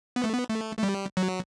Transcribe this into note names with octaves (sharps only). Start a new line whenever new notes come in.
B3
A3
B3
A3
A3
G3
F#3